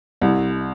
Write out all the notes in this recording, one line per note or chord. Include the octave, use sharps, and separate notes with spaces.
C2